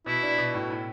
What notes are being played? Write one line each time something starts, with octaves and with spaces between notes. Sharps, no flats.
B2 E4
D4
B2
A2
A2